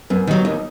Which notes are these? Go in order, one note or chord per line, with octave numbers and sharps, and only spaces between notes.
F#2 B3
D#3 F#3
D#2 D#4